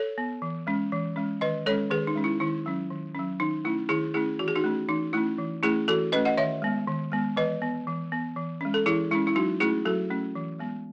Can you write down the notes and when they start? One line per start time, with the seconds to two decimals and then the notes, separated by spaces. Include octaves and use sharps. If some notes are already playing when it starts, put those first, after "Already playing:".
Already playing: A4 C#5
0.18 B3
0.42 E3
0.67 G#3 C#4
0.92 E3
1.16 G#3 C#4
1.41 D#3 B4 D#5
1.66 G#3 C#4 A4 C#5
1.91 D#3 G#4 B4
2.07 D#4
2.15 G#3 C#4
2.24 E4
2.40 D#3 E4
2.66 F#3 C#4
2.90 D#3
3.15 F#3 C#4
3.40 D#3 D#4
3.65 A3 C#4 E4
3.89 D#3 E4 G#4
4.14 A3 C#4 E4 G#4
4.39 E3 F#4
4.48 G#4
4.56 D#4 F#4
4.64 A3 C#4
4.88 E3 D#4
5.13 A3 C#4 E4
5.38 E3
5.63 A3 C#4 E4 G#4
5.88 E3 F#4 A4
6.12 A3 C#4 B4 D#5
6.25 D#5 F#5
6.37 D#3 C#5 E5
6.62 G#3 B3
6.88 D#3
7.12 G#3 B3
7.37 E3 B4 D#5
7.62 B3
7.87 E3
8.12 B3
8.36 E3
8.61 G#3 C#4
8.74 A4
8.86 E3 E4 G#4
9.11 G#3 C#4 E4
9.27 E4
9.35 F#3 D#4 F#4
9.60 A3 C#4 E4 G#4
9.85 F#3 F#4 A4
10.10 A3 C#4
10.35 E3
10.59 G#3 B3